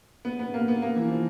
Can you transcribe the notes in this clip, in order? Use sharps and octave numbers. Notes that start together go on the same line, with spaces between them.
B3
B3
A#3
B3
A#3
E3
F3